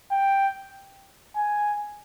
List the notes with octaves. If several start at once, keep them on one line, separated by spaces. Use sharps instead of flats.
G5
G#5